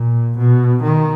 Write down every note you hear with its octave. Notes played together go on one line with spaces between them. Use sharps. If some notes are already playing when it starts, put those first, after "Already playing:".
Already playing: A#2
B2
D#3